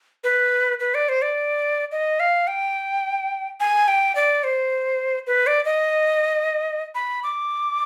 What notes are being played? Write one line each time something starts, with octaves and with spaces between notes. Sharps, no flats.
B4
B4
D5
C5
D5
D#5
F5
G5
G#5
G5
D5
C5
B4
D5
D#5
B5
D6